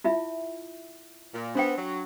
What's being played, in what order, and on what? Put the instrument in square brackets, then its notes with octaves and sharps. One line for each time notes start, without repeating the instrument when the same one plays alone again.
[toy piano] E4 F4 E5
[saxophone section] A#2
[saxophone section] B3 C4 [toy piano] D4 G5
[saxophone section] F#3